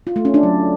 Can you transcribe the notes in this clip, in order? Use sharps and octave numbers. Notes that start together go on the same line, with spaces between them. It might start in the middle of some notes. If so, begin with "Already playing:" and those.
F4
A3
C#4
D4
F#3